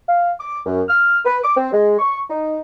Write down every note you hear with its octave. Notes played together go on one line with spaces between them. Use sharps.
F5
D6
F#2
F6
B4
D6
C4
G#3
C#6
D#4